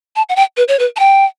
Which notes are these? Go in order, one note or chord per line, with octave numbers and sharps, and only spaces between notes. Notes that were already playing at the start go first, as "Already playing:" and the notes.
A5
F#5
G5
B4
C#5
B4
A5
G5